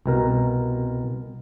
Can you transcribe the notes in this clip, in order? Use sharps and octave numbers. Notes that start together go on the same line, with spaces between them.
C2 B2 A#4